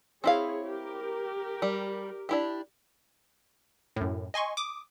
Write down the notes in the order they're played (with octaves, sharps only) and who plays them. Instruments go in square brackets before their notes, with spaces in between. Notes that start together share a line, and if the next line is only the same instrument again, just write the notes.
[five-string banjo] C4 E4 F5 [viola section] G#4 C#5
[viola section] G4 A#4
[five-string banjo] G3
D4 E4 G4
[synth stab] F#2 A2
D#5 G#5 C6 C#6
D6 D#6